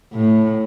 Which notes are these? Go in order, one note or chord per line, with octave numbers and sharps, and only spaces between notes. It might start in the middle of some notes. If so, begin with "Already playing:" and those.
A2